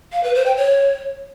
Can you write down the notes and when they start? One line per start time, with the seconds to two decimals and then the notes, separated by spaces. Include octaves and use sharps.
0.12 F5
0.23 B4
0.35 C5
0.46 G5
0.57 C#5